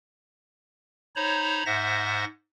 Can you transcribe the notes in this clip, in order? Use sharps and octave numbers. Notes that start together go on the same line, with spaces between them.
D#4 C5 C#5 A#5 B5
G#2 C5 E5 F#5 A#6